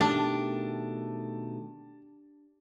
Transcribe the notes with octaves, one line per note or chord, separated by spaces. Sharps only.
B2 D#3 A3 D4 G4 A5